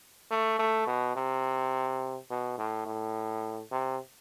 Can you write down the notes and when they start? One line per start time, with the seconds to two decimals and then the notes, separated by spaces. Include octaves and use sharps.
0.31 A3
0.59 A3
0.87 B2
1.16 C3
2.30 B2
2.58 A2
2.86 A2
3.71 C3